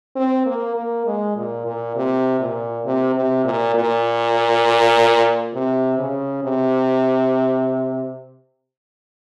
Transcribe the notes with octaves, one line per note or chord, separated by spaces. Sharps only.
C4
A#3
A#3
G#3
A#2
A#2
C3
A#2
C3
C3
A#2
A#2
C3
C#3
C3